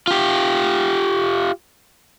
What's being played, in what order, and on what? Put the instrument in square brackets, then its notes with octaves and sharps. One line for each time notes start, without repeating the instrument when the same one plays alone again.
[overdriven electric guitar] F4 G4